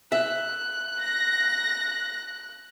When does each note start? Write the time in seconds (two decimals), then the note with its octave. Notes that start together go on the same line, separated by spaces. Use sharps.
0.12 E5 F#6
1.01 A#6